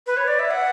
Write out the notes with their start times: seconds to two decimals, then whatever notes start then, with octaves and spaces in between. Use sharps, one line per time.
0.07 B4
0.17 C#5
0.28 D5
0.39 E5
0.51 F#5